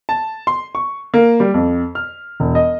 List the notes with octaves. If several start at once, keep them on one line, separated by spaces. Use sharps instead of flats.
A5
C6
C#6
A#3
G3
F2
F6
E1
D#5